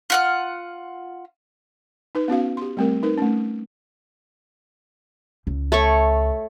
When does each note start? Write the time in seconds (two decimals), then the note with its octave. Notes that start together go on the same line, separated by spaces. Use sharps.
0.10 F4 F#5 F6
2.15 D#4 B4
2.28 B3 C#4 F#4 F5
2.57 G4 C6
2.77 G3 A3 C4 G4 A#4
3.03 D#4 A#4 B4
3.18 A3 C#4
5.47 C#2
5.72 A3 C#5 C#6